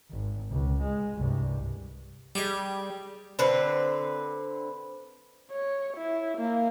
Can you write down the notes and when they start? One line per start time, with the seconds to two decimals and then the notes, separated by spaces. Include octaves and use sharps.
0.11 G#1
0.51 C#2
0.82 G#3
1.18 C2 G2
2.35 G3 G4 G#4 D#5
3.39 D3 C4 B4
5.52 C#5
5.97 E4
6.38 A#3